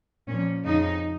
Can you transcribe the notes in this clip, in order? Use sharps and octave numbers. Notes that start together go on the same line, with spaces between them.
A#2 F3 C#4
F2 C#3 F3 D#4